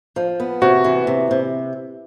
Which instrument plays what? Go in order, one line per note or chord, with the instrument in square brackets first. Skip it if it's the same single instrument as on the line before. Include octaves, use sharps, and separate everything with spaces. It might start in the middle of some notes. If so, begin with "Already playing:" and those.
[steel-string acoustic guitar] F3
B3
[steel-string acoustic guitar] C3 [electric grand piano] F#4
[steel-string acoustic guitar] E3
C3
C3